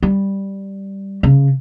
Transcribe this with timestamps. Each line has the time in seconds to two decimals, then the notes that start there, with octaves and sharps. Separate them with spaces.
0.03 G3
1.23 C#3